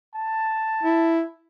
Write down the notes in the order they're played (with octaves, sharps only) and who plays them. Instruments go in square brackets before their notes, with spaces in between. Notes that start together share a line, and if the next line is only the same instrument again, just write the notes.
[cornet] A5
[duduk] E4